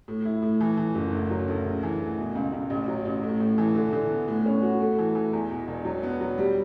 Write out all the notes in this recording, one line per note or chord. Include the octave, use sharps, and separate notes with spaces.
A2
E4
A2
E3
E3
F#1
D2
F#3
D2
C#3
E3
D2
B2
C#2
C#2
A1
F#3
A1
A2
A2
E3
D3
D3
B3
A2
C#4
F#4
A3
E3
E3
E2
B2
E1
F#3
B3
F#3
G3